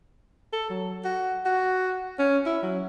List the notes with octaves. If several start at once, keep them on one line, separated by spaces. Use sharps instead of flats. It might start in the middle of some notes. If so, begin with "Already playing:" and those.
A4
F#3
F#4
F#4
C#4
E4
F#3